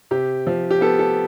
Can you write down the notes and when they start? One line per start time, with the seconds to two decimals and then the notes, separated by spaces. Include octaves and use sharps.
0.11 C3 G4
0.47 F3
0.71 G4
0.81 B3 A4
0.99 A4